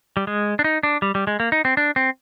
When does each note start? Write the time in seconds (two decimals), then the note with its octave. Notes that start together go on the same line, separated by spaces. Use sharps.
0.17 G3
0.27 G#3
0.59 D4
0.64 D#4
0.83 D4
1.02 G3
1.15 G3
1.27 G#3
1.40 A#3
1.52 D#4
1.65 C4
1.77 D4
1.96 C4